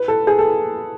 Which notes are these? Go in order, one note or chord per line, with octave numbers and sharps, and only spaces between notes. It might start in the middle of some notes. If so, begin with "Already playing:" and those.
Already playing: B4
A4
G#4
A4